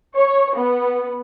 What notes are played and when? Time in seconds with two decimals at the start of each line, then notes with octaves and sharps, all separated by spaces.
0.17 C#5
0.57 B3